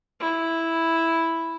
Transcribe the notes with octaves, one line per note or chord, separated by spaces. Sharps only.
E4